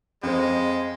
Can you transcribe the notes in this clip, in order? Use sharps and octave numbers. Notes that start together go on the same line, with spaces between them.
F2 G#3 C5